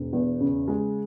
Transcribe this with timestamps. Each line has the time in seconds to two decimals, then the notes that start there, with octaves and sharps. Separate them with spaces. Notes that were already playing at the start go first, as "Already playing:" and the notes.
Already playing: E1
0.13 E2
0.40 C#3
0.68 G#3